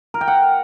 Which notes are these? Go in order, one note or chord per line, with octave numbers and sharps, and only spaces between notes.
A#4
G5
F#5